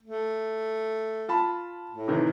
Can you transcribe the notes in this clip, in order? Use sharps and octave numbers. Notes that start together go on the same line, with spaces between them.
A3
F4 A5 B5
A2
C3 D#3 E3